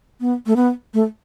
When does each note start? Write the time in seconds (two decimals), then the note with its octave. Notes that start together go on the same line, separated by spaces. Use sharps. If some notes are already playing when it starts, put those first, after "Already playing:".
0.21 B3
0.46 A3
0.56 B3
0.94 A3